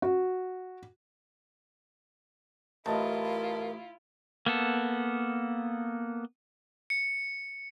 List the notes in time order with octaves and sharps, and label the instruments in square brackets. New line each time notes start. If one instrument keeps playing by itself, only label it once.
[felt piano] F#4
[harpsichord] A1 [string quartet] E4 F4 [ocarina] A#4 [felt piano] D#5 A5
[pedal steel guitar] A#3 B3 A4
[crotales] C#7